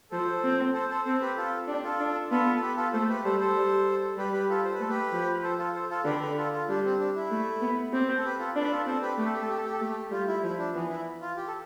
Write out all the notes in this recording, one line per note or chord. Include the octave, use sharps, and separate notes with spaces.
F3 A4 C5
C4
A4 C5
A4 C5
C4 A4 C5
G4 B4
F4 A4
D4 G4
F4 A4
D4
B3 F4 A4
A4
G4 B4
F4 A4
A3 A4 C5
G4 B4
G3 A4 C5
A4 C5
G3
G3 G4 B4
G4 B4
F4 A4
C5
B4
A3 A4
G4 B4
F3
A4 C5
F4 A4
A4 C5
F4 A4
D3 G4 B4
G4 B4
F4 A4
F4
G3 D4
C4
D4
E4
A3
B3
C4 G4
A4
G4 B4
F4 A4
D4 B4
F4 A4
C4 A4 C5
G4 B4
A3 G4
A4
G4
A4
G4
A4
G4
A4
A3 G4
G3 F4
E4
F3 E4
D4
E3 B3
E4
F4
G4
A4